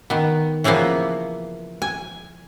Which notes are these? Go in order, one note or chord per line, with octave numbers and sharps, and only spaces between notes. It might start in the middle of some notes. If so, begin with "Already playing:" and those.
D#3 B3
C#3 E3 F3 A#3 B3
G#5